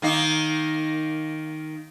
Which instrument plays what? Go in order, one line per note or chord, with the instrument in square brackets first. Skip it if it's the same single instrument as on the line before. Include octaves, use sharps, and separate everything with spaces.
[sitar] D#3 A#3 D#4